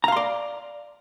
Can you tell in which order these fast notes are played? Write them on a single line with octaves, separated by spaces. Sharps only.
A#5 F5 C6 D5